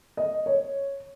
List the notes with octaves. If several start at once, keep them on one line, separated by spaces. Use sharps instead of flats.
D#5
C#5